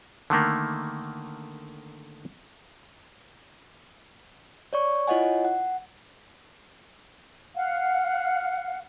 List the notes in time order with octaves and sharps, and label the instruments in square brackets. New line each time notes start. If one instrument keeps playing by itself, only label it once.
[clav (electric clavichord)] D3 D#3 A3 A#3
[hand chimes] C#5 D5 C#6
E4 F4 C#5 D#5 F#5 G#5
F#5
[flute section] F5 F#5